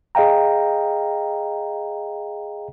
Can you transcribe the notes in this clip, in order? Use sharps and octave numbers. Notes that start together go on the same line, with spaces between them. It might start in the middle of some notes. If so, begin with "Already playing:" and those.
G#4 D#5 F5 G5 A#5